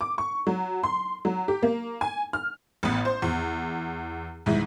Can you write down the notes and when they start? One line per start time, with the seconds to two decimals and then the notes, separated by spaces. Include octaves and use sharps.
0.01 D6
0.18 C#6
0.47 F#3
0.83 C6
1.25 F#3
1.48 G4
1.63 A#3
2.01 G#5
2.33 F6
2.83 A1 B3
3.05 C5
3.22 E2
4.46 C2 G#2 E3